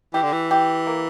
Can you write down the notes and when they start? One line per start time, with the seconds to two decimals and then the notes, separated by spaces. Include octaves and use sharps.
0.14 E3 G4
0.23 D3
0.32 E3
0.51 G4
0.87 A#3